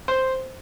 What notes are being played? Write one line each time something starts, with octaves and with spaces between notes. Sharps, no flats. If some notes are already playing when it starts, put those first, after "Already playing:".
C5